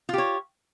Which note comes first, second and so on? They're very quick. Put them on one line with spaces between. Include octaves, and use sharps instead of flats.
F4 G4 C#5